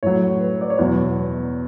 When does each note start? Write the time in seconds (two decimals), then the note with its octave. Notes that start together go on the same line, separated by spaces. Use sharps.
0.03 A2 F#3 C#5
0.40 B4
0.61 D5
0.70 C#5
0.78 E2 B2 F#3 B4